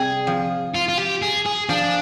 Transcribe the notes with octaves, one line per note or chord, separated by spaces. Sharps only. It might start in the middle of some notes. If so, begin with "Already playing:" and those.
Already playing: C3 G3 G#4
F3
F4
F4
G4
G#4
G#4
F3 D4